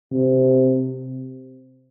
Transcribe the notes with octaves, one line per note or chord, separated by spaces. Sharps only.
C3